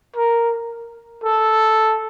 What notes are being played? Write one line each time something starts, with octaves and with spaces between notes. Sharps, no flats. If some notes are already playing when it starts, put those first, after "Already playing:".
A#4
A4